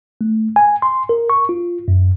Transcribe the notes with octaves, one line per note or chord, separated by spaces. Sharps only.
A3
G#5
C6
A#4
C#6
F4
F#2